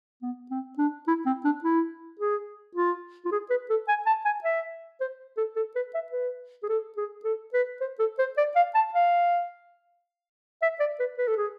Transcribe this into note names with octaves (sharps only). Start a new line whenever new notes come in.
B3
C4
D4
E4
C4
D4
E4
G#4
F4
F4
G#4
B4
A4
G#5
A5
G#5
E5
C5
A4
A4
B4
E5
B4
G#4
A4
G#4
A4
B4
C5
A4
C5
D5
F5
A5
F5
E5
D5
B4
B4
A4
G#4